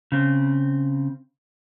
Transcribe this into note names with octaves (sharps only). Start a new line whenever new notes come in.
C#3 C4